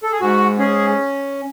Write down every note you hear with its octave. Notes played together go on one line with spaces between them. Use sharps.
A4
G#4
G#2 F#4
C#4 G#4